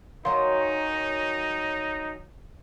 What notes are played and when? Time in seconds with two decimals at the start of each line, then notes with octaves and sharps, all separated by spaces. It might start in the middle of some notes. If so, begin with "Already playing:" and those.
0.25 D#3 F#3 C#4 D#4 F5 C6